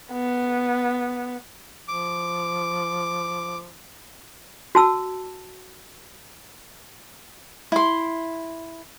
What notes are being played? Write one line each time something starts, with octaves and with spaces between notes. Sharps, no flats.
B3
F3 D6
F#4 A5 E6
E4 C6